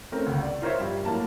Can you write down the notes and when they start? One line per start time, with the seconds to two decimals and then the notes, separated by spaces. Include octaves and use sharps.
0.12 A3 C4 C#4 A#4
0.26 G1 C#2
0.43 D5
0.62 F4 A#4 C5 C#5 E5
0.79 G2 G3
1.05 A2 F#3 A#3 A5